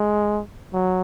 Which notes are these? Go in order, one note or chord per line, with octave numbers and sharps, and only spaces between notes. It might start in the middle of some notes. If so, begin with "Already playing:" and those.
Already playing: G#3
F#3